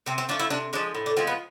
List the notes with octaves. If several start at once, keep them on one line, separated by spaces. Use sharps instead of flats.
C3 C4
C4
F3 A3 D4
E4
C3 D4
F3 G#3 D4
A2
D4
F3 G#3 C4
B3